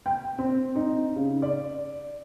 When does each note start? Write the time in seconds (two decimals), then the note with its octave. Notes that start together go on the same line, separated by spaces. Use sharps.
0.06 G5
0.38 C4
0.76 D#4
1.16 C#3
1.42 D5